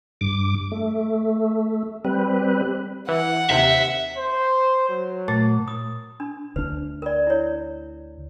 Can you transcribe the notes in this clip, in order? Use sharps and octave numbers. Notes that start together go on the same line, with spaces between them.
G2 D6
A3
G3 C4 B4
E3 F#5
D#2 C3 E5
C5
F#3
A#2 A3 A6
D#6
D4
D2 D4 B4
A#4 D5
E4 C#5